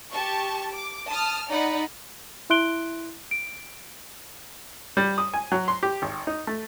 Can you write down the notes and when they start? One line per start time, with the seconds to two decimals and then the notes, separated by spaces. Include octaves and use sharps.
0.11 G4 A5 C#6
0.70 D6
1.09 A5 D#6 F6
1.49 D#4 D5 F#5 B5
2.50 E4 E5 C6 F#6 D7 G7
3.31 D7
4.97 G3
5.18 D#6
5.34 G#5
5.52 F#3
5.68 C6
5.83 G4
6.02 G#1
6.27 D#4
6.47 A3